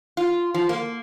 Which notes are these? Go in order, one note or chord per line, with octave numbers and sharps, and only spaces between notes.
F4
F3
A#3